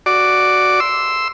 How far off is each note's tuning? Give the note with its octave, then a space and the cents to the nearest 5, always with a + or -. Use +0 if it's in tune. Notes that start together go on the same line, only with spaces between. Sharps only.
F#4 +0 D5 +0
C6 +0 E6 +0